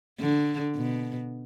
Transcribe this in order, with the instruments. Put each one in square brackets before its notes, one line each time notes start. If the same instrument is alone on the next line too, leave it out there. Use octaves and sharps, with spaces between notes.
[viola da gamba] D3
B2